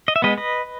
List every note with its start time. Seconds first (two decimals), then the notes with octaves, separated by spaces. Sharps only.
0.08 D#5
0.16 E5
0.22 G#3 B3 B4 D#5
0.37 B4 D#5